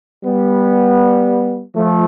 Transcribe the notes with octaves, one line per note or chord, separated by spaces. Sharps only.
G3 B3
F3 A3